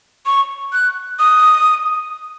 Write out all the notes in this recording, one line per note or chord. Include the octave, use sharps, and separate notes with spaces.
C#6
F#6
D#6